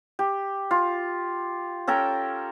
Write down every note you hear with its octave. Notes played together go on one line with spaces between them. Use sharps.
G4
F4
C#4 A4 A#4 G5